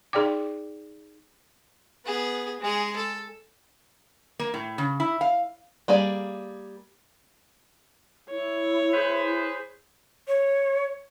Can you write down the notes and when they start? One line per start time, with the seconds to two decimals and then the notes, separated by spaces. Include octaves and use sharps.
0.13 D#4 G#4 D5 G5 D6
2.05 B3 G#4
2.60 G#3 G#4
2.96 A4
4.39 A#3
4.54 A2
4.78 C#3
5.00 E4
5.21 F5
5.88 G3 A#3 G#4 D5
8.30 E4 C#5
8.94 G#4 B4 C5
10.28 C#5